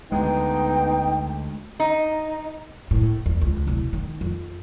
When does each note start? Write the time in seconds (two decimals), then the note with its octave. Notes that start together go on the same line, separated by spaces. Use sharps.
0.12 D2 G#3 B3 D#4 G5
1.80 D#4
2.91 A2
3.26 E2
3.42 C#2
3.67 E1
3.93 D#3
4.21 F2